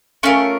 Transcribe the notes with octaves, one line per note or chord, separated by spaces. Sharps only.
A3 C#4 F4 A#4